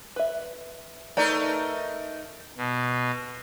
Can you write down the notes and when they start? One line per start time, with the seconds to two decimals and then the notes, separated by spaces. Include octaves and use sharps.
0.16 B4 E5
1.17 A3 D#4 A#4 B4 D5 A#5
2.57 B2